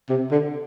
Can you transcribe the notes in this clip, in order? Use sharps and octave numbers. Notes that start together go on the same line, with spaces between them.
C3
D3